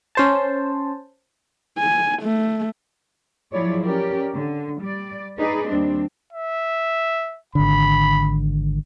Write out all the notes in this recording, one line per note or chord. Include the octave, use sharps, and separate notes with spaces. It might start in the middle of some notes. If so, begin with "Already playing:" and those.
C#4 C5 A5
G#5
A3
F3 F#3 E4 G#4 C#5 D5
C#4 G4 A#4 D5
D3
G3 D5
D#4 G#4 B4 D5 D#5
D#2 G3 C4 D4
E5
G#1 D3 B5